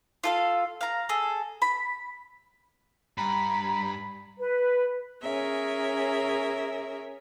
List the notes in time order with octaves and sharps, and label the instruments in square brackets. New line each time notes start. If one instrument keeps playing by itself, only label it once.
[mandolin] F4 A4 F5
F5 A#5
G#4 A4
B5
[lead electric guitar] G2 [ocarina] A#5 [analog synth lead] B5
[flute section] B4
[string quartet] C#4 G#4 A#4 E5